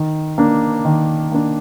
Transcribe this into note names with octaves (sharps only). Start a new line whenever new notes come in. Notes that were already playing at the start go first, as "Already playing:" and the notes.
Already playing: D#3
A#3 D4
D#3
A#3 D4